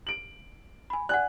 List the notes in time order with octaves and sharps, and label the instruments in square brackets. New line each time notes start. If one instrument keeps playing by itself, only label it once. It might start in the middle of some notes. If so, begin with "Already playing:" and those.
[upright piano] D7 F#7
[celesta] G#5 B5
[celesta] D5 F#5 [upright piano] G#5 F#6